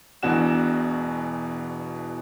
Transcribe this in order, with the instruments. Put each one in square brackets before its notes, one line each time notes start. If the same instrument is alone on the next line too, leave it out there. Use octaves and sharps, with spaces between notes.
[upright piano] E1 B2 E3 D4 F#4 E7